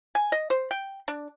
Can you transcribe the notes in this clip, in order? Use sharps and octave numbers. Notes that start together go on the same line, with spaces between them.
G#5
D#5
C5
G5
D4